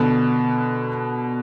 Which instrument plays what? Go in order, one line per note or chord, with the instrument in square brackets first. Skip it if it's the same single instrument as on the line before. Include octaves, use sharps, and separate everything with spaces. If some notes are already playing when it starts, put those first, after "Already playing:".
Already playing: [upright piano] B2 D3